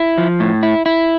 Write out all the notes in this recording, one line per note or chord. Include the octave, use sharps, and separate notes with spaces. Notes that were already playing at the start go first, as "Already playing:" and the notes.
Already playing: E4
F3
A2
E4
E4